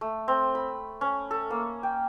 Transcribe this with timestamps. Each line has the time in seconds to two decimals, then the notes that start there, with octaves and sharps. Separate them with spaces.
0.01 A3
0.28 C4
0.55 B5
1.01 C#4
1.31 A4
1.50 A#3
1.83 G5